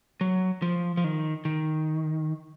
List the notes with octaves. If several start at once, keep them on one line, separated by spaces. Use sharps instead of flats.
F#3
F3
F3
D#3
D#3